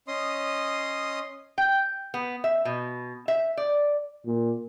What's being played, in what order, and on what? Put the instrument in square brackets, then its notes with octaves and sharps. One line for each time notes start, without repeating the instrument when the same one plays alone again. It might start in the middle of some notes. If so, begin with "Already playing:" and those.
[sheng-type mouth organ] C#4 D#5 C6 D#6
[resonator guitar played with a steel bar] G5
B3
E5
B2
E5
D5
[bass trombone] A#2